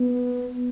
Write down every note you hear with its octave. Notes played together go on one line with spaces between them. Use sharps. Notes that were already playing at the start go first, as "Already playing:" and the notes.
Already playing: B3